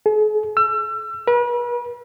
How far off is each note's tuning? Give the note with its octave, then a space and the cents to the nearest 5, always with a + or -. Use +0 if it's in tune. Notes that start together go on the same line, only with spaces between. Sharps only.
G#4 +45
E6 +35
B4 -40